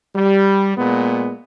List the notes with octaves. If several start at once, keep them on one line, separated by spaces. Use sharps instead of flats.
G3
A#2 G#3 B3